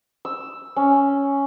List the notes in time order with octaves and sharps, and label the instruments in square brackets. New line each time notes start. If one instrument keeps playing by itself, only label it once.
[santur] E6
C#4